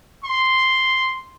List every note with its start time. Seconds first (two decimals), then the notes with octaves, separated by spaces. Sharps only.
0.24 C6